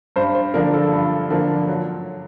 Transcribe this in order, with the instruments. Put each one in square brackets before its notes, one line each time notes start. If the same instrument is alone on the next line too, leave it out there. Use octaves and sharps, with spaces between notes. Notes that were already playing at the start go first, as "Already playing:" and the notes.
[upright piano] G2 [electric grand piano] C5
[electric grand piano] C5
[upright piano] D3 F3 A#3 D4 [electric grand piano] A#4
[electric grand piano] A4
[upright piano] G2
D3 F3 A#3 D4
F#3